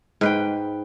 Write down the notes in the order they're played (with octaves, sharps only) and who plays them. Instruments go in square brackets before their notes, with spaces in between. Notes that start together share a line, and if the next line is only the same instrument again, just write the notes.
[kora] G#2 B4 G5